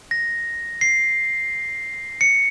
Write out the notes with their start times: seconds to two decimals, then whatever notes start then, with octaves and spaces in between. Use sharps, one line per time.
0.11 A#6
0.81 C7
2.21 C#7